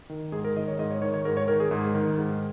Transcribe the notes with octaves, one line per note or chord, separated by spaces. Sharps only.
D#3
G#2 G#4
A#4
D#3 D#5
C#5
G#2 D#5
C#5
D#3 C#5
C#5
G#2 A#4
C#5
D#3 A#4
G#4
G#2
D#3
G#2